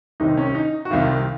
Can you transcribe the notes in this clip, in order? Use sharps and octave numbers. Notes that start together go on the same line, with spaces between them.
C2 C3 D#3 D#4
C#4
D#4
F#4
C2 C3 D#3 F4